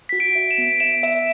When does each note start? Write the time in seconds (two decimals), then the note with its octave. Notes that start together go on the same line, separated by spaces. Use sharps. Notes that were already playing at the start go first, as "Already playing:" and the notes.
0.09 F#4 B6
0.20 D7
0.35 E5
0.51 E7
0.58 B3
0.80 E5 E7
1.03 E5 E7